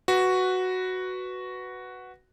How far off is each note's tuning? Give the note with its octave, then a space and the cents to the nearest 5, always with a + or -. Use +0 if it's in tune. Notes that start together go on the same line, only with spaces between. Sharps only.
F#4 +0 B4 +0